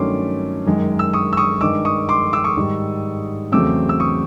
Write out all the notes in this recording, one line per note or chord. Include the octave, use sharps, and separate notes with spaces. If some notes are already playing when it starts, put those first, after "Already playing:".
Already playing: G2 D#3 F#3 A3 C#4 C6 D6
F#2 D#3 G#3
E6
C#6 D#6
E6
C#6 D#6
G2 D#3 G#3 D6 E6
C#6 D#6
C6 D6
D6 E6
C#6 D#6
G#2 D#3 G3
E2 C#3 F#3 A3 C4 D6 E6
E6
C#6 D#6